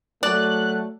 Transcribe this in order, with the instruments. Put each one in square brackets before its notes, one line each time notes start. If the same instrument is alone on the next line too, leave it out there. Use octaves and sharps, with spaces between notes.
[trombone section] F#3 A3 [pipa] D5 [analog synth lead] F#6